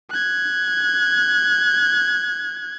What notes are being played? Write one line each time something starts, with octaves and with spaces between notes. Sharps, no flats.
F#6 G#6